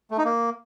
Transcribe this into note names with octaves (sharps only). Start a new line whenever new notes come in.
A3
D#4
A#3